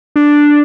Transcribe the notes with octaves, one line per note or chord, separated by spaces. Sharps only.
D4